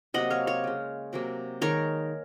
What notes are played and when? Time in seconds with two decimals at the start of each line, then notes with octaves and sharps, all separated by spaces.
0.14 C3 F#3 A#3 D#5 F#5
0.30 C#5 F5
0.47 C#5 F5
0.64 C#3 G#3
1.13 C3 F#3 A#3
1.61 D#3 G#3 A#4 C#5